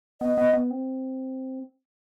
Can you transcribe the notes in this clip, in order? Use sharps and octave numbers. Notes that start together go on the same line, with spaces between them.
B3 D#5
B3
B3
C4